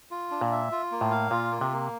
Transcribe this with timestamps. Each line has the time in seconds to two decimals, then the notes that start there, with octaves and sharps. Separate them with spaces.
0.11 F4
0.31 D4
0.41 A#2
0.51 E5
0.72 F4
0.92 A#3
1.01 A2
1.11 F5
1.31 A#2 F4
1.51 A#3
1.61 C3
1.72 A#3